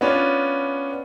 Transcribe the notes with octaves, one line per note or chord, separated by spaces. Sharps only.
B3 C#4 D4 F4